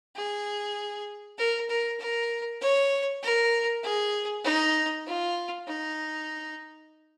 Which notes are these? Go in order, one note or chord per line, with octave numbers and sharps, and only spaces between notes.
G#4
A#4
A#4
A#4
C#5
A#4
G#4
D#4
F4
D#4